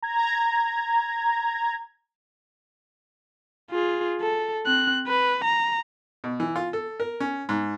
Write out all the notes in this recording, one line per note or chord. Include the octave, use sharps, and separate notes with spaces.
A#5 G#6
F4 G#4
A4
C4 F#6
B4
A#5
B2
E3
F4
A4
A#4
C#4
G#2